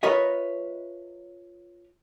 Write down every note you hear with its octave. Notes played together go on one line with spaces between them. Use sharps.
F4 A#4 B4 C#5 D#5 E5